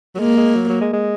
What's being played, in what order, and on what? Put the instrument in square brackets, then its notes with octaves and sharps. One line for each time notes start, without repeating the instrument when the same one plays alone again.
[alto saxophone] F#3
[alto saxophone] G#3 [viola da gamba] A#3
[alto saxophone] G#3
F#3
F#3
G#3
G#3